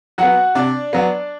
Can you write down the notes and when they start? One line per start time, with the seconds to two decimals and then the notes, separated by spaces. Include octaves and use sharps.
0.18 F#3 B3 F#4 F#5
0.55 C3 D4 D5
0.93 F#3 B3